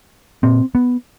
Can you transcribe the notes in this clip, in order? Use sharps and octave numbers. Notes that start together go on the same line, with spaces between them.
A#2 C4
B3